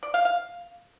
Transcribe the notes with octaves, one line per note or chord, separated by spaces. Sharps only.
D5
F5
F5